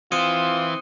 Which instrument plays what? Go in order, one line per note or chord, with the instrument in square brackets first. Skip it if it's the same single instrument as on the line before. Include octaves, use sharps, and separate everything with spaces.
[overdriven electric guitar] E3 [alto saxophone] C4 [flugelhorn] F4 [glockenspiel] D#6 C#7 D#7